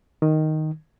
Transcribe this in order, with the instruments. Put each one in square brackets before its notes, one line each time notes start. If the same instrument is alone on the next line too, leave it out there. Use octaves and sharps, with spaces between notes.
[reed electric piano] D#3